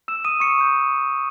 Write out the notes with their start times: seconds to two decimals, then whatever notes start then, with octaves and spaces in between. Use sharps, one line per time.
0.08 E6 E7
0.25 D#6 D#7
0.40 C#6 C#7
0.57 B5 E6 G6